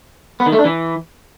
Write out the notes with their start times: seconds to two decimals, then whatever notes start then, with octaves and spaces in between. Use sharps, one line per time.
0.40 B3
0.46 D#3
0.53 A3
0.59 D4
0.65 E3